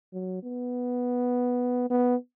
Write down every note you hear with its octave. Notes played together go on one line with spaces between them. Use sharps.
F#3
B3
B3